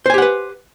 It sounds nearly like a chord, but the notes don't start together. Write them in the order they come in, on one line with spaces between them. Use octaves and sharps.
C5 G#5 G4 F#5 B4